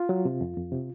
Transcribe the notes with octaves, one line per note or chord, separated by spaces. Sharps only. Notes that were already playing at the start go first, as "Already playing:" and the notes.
Already playing: F4
F#3
C3
F2
F2
C3